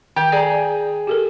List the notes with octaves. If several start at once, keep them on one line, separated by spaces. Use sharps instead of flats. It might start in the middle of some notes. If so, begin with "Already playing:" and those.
D#3 G4
G#4 D5 A#5
G4 A4 A#4